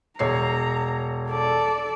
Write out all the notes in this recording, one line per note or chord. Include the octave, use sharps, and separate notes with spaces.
E1 C#5 A#5 C7
A4 D5